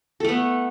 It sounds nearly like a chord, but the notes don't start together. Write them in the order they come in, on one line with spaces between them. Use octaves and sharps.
A4 A3 B3